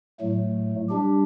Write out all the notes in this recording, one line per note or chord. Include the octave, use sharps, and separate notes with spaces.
A2 F#3 A3
G3 D4 G4